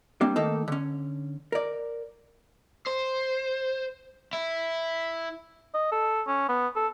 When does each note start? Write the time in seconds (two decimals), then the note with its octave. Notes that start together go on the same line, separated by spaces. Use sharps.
0.21 G3 A#3 C4 D4
0.36 D#3 A3 A#3 D#4 A4
0.68 D3 C#4
1.52 A#4 D5
2.87 C5
4.33 E4
5.74 D#5
5.92 A4
6.28 C#4
6.49 B3
6.76 A4